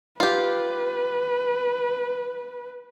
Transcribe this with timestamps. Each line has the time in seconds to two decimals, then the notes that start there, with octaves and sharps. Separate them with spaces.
0.20 F4 G4 B4